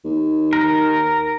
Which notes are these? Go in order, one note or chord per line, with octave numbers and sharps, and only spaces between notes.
D#2
A#4